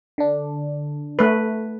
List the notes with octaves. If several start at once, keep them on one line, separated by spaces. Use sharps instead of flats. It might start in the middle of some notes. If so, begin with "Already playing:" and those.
D3 D4
A3 B4